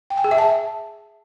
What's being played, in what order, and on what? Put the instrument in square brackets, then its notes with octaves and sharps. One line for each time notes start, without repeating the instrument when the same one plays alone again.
[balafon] G5
G#5
G#4
E5
A5